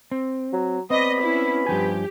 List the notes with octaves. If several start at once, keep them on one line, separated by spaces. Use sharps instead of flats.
C4
F#3
B3 C4 D5 D#5 B5
C#4 E4
G2 F3 G4 G#5